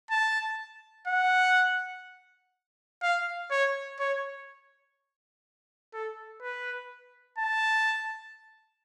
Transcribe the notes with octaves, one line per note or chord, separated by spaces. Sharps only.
A5
F#5
F5
C#5
C#5
A4
B4
A5